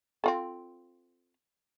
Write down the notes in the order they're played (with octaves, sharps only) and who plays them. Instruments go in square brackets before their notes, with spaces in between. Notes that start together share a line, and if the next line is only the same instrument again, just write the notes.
[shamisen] C4 F4 A4